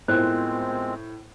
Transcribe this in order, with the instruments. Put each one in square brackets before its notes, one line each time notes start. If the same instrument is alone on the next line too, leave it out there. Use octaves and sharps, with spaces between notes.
[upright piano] A2 [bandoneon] G#3 C4 [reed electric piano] B3 F4 A#4 [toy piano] C5